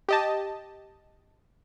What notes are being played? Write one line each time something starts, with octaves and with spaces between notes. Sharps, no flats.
G4 D#5 A5